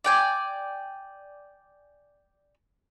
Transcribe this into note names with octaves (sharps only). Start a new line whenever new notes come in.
D5 G5 G#5